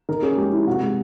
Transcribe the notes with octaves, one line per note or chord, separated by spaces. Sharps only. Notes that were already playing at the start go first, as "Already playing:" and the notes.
D#3 A#4
C#4 G#4
G#3 G4
E4 G4
C3 F#4
G#3